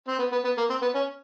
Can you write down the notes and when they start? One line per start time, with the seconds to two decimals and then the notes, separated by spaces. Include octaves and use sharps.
0.08 C4
0.19 B3
0.32 B3
0.44 B3
0.57 A#3
0.70 C4
0.82 B3
0.95 C#4